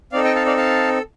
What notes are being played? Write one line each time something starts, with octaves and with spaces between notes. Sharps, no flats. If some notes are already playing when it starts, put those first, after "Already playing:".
C4 D#4 A4 D5 F5
D#5 G5
F5 A5
D5 F5
F5 A5